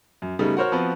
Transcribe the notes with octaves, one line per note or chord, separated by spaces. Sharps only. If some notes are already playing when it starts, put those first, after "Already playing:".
F#2
C#3 G3 A3 B3 D#4
F#4 A#4 C5 C#5 F6
F3 B3 C4 F#4 B4